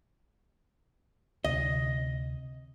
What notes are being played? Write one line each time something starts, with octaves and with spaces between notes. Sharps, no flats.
D2 C3 D#5